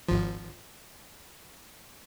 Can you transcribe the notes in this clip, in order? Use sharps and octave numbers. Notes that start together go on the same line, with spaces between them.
G#1 F3